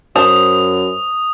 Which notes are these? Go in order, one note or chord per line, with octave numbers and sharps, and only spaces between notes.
F#2 C5 A5 D#6